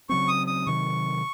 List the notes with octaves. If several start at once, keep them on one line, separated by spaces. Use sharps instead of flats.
C#3 F#3 C4 C#6
D#6
D#6
C3 D#3 F#3 C#6